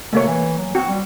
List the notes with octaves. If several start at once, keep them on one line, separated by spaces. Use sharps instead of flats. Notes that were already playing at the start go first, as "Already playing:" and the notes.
C3 A3 A#3 C#5
E3
F#3
C4 F#4
G3